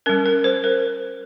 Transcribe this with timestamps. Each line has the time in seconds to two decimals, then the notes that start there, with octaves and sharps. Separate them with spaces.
0.06 G3 C#4 A#4
0.26 A#4
0.44 C5
0.64 A#4